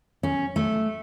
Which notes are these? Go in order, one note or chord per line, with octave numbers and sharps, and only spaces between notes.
C#4
A3